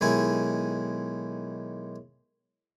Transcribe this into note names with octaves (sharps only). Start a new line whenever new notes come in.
B1 D#3 G#3 E4 G4 G#5